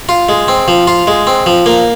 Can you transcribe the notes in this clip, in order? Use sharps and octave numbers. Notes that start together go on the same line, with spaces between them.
F4
G#3
C4
F3
F4
G#3
C4
F3
A#3